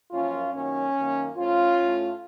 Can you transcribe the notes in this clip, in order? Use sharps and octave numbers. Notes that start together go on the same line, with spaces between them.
F#2 F3 A#3 C#4 F4
F#2 D#3 F#3 A#3 C#4
F#2 D#3 A#3
A2 F3 A3 C#4 F4
A2 A3